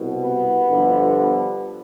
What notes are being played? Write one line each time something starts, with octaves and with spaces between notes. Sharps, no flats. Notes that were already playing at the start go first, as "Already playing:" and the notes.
Already playing: C2 B2
B3
G1 G2 D3 F3